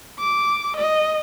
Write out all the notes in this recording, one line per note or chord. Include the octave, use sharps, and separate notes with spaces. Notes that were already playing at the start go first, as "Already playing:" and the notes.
D6
D#5